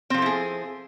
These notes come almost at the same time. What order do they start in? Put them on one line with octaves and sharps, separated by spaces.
C4 F3 A4 E4 G#4